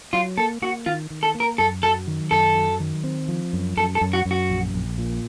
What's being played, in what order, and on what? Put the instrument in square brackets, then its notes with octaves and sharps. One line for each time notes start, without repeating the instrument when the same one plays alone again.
[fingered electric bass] F#3 [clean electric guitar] F4
[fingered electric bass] A#3 [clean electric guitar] A4
[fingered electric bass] A#3 [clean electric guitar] F#4
[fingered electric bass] D#3 [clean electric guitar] F4
[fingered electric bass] D#3
[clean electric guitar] A4
[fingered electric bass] A#3
[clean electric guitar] A#4
[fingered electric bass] F#2 [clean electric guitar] A4
[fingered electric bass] F#3 [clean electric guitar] A4
[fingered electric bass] D#3
[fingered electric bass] F#2 [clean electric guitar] A4
[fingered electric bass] F#3
D#3
C4
F3
F#2
[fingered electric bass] F#2 [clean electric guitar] A4
[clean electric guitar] A4
[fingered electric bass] F#2
[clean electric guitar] F#4
[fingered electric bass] F#2
[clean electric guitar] F#4
[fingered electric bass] A#1
A#1
A#2